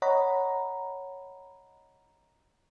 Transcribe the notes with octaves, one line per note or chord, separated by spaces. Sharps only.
C#5 D#5 F#5 A#5 B5